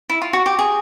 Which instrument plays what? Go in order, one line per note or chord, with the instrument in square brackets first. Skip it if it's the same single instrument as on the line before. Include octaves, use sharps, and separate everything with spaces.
[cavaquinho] E4
F4
F#4
G4
G#4